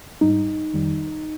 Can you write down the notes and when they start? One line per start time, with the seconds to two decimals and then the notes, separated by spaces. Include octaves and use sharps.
0.21 G#2 G3 D#4
0.74 F2 D#3 G3